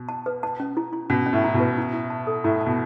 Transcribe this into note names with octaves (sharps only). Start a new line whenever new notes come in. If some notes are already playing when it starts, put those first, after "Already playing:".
Already playing: B2
A5
B4
A5
C#4
E4
E4
B2 C#4
C#4
A2
E4
B2
B4
E4
E4
A5
A4
A2 E4
A5
B2